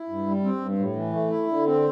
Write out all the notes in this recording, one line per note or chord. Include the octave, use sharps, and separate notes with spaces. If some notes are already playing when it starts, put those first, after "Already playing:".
Already playing: E4
G2
G3
C4
G2
A2
E3
A3
E4
D3
C4